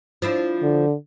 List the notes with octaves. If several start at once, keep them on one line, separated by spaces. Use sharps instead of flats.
F3 D4 E4
D3